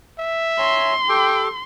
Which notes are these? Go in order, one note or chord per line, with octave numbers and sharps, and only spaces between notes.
E5
C#5 G#5 A#5 C6
G4 A4 G5 D6